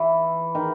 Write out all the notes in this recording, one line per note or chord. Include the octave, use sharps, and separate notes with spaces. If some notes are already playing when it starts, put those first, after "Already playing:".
Already playing: E3
D#3